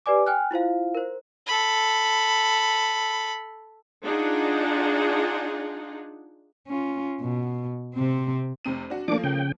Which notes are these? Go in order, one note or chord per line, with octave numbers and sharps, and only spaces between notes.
G4 B4 D5 G#5 D6
G5 G#5 F6 F#6
E4 F4 C5 F5
A#4 C5
A4 B5
D4 D#4 F4 G#4 F#5
C#4 F4
B2
C3 C4
F1 C3 D#7
D4 F#4
F3 A3 A#3 D4 D6
C#3 G5